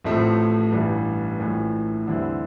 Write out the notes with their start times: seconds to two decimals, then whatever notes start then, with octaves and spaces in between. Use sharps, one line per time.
0.04 A1 A2 F3 A3 C4
0.72 A1 G2 E3 G3
1.39 A#1 A2 E3
2.06 E2 D3 G3 C4 E4